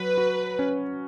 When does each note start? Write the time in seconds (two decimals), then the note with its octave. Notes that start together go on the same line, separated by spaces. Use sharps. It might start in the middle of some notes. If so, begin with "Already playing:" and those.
Already playing: F#3 B4
0.18 F#4
0.59 C#4